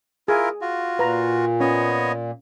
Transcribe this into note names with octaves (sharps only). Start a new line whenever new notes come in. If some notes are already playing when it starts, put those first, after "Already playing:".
E4 F4 G#4 A#4 G#5
F4 F#4
A#2 B4 A#5
B3 C#4 C#5 D#5